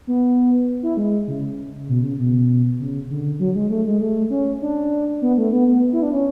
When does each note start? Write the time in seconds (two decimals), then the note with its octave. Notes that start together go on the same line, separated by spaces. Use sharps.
0.07 B3
0.83 E4
0.97 G#3
1.28 C#3
1.88 B2
2.03 C#3
2.19 B2
2.80 C#3
3.10 D3
3.40 F#3
3.55 G#3
3.70 A3
3.86 G#3
4.01 A3
4.30 C#4
4.62 D4
5.22 B3
5.38 A3
5.53 B3
5.68 B3
5.93 E4
6.02 D4
6.13 C#4